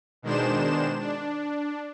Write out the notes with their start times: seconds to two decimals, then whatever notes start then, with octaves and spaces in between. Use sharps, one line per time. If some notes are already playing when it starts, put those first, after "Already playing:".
0.22 B2 D#3 G#3 D4 C5 E7
1.00 D4